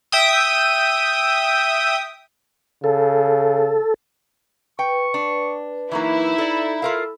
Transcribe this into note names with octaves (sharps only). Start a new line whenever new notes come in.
E5 G5 D#6
C#3 A4
B4 G5 C#6
D4
E3 F#3 A#3 D#4 E4
A4 D5
F4 A4 A#4 F5